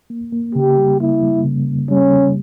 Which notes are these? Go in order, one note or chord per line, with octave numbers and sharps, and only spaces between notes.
A#3
A#3
C#3 G4
G3
A#3 E4
G3
C#3
C#3
G3 C#4
C#3